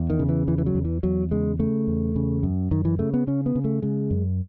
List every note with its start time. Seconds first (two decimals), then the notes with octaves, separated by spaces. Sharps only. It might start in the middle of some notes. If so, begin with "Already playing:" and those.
Already playing: E2
0.10 D#3
0.19 C#3
0.29 E3
0.47 E2 E3
0.58 E3
0.66 F#3
0.75 E2
0.85 E3
1.03 E2 F#3
1.31 C#3 G#3
1.59 C#3 A3
1.87 E2
2.16 C#3
2.43 F#2
2.71 F#2 D#3
2.85 E3
2.99 C#3 A3
3.14 B3
3.27 C#3 C#4
3.46 B3
3.55 C#3
3.64 A3
3.82 C#3 G#3
4.11 F#2